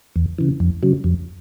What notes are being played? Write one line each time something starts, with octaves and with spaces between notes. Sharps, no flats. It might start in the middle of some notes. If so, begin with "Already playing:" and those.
E2
C#3 E3
F2
C#3 F#3
F2